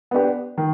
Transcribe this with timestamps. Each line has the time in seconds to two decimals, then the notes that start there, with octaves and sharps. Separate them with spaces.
0.11 B3 D4 G4
0.58 D#3